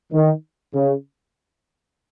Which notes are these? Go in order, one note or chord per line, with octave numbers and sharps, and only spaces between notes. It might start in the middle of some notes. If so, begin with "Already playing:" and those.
D#3
C#3